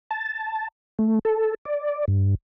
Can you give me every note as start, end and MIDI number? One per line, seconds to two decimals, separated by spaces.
0.11 0.68 81
0.99 1.19 57
1.25 1.54 69
1.65 2.05 74
2.08 2.35 43